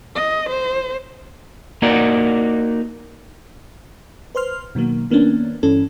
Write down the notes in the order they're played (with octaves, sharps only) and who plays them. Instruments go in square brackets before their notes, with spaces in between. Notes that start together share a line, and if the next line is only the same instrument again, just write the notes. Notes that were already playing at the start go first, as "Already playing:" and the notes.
[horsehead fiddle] D#5
C5
[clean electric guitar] A#3 D#4 F#4 A#4 D5
[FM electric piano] B4 C5 C6 F6
B2 D#3 F#3 A#3
D#3 A#3 B3 C#4 D4
G2 E3 C#4 A4